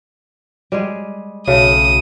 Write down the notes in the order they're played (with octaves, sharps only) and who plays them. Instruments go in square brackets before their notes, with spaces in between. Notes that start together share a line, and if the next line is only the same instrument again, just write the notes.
[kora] G3 G#3 G#4
[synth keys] B1 [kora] C#3 A3 [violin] D#6